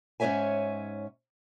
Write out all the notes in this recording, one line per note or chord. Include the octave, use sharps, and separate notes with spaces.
G#2 C#4 B4 C#5 E5 G#5